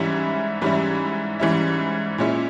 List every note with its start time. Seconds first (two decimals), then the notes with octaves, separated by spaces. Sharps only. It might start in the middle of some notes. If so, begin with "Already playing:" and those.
Already playing: G#2 E3 G3 C#4 E4
0.62 G#2 E3 G3 C#4 E4
1.39 G#2 E3 G3 C#4 E4
2.18 A#2 G#3 C#4 E4